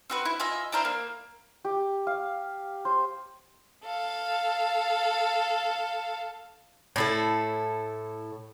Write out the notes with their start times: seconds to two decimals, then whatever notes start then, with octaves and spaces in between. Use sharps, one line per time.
0.10 C4 F#4 B4
0.25 E4
0.40 F4 D#5 E5 G#5
0.72 D4 E4 A#4 C5
0.85 A#3
1.65 G4
2.07 F5
2.85 C5
3.85 A4 F5
6.96 A2 E4 A4